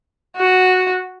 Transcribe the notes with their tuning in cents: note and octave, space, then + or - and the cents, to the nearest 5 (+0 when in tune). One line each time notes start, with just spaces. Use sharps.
F#4 -5